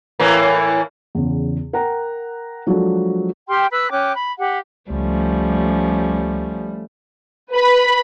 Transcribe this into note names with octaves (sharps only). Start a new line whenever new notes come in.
A2 E3 A#3
E2 C#3
A#4 F#5 G5 A#5
F3 F#3 G#3 D4 F#4 A4
G4 G5 C6 F6
B4 B5 E6 F#6
C#4 G5 D6 F#6
B5
G4 F#5
C#2 F3 G3 A3 C#4
B4 B5